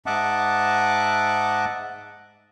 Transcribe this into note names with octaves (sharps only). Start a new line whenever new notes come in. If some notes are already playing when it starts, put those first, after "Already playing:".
G#2 D#5 E5 F#5 A5 D6